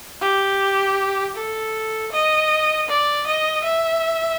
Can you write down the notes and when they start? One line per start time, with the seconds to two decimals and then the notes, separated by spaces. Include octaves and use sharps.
0.21 G4
1.36 A4
2.12 D#5
2.89 D5
3.27 D#5
3.65 E5